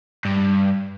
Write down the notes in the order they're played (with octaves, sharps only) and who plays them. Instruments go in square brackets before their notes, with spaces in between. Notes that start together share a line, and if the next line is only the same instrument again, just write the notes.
[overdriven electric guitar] G2